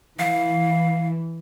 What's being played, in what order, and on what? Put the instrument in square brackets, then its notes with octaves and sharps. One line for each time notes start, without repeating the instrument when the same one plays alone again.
[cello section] E3 [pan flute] F5